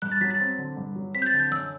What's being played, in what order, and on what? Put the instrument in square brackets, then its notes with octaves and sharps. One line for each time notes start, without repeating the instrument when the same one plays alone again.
[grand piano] G2 [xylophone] F#6
[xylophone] A6
[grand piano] F#3 [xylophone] B6
[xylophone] A6
[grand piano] C4
D3
G2
F#3
[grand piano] C4 [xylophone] B6
[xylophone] G6
A6
[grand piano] D3
[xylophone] G6
[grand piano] F#2 [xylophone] E6